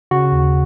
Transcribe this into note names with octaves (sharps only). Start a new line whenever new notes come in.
C#3 F#4
D#2